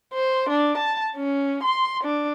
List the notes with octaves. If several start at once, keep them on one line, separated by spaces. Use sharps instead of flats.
C5
D4
A5
C#4
C6
D4